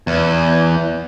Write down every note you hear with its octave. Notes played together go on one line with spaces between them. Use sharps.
E2